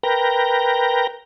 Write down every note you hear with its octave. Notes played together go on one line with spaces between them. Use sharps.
A#4 B4 G5 A#5